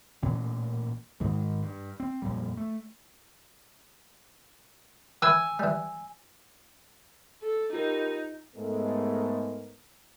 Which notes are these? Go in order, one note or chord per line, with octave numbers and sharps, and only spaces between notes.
A1 A#2 E3 C#4
G#2 D#3 G#3
G2
C4
F2 A#2 G3
A3
E3 B4 G#5 E6
E3 G3
A4
D#4 F4 G4 A#4
G#2 G#3 A3 B3 A4 A#4